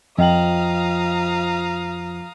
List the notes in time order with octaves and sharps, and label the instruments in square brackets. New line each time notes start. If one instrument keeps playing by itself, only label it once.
[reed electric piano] F2 [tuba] F3 [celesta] D#5 G5 F#7 [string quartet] F5 A#5 D#6